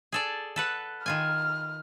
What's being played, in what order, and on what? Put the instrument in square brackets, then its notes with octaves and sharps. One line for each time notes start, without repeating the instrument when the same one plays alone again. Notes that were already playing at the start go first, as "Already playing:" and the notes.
[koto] G#4 A4 D5
A4 B4 F#5
[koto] D#3 F4 G#5 [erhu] F6